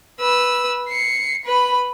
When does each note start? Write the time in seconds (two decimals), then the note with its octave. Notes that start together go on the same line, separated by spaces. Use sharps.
0.20 B4 E6
0.89 C7 C#7
1.45 B4 B5